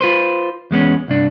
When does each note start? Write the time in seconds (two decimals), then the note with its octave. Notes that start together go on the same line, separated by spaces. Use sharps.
0.01 F4 B4 C5
0.71 E2 G#3 B3 C#4
1.08 C2 G2 D4